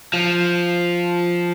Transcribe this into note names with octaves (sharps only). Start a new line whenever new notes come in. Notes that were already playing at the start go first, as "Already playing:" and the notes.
F3